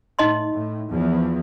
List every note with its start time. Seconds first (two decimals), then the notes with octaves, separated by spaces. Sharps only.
0.19 A2 D#4 D#5 C6
0.50 A2
0.90 E2 F3